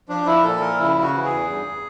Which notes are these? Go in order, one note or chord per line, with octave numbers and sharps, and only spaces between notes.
F3 D4
F3 E4
A#2 A4
F3 A#4
C#3 E4
C#3
F#4
E3
G#4
E2
G2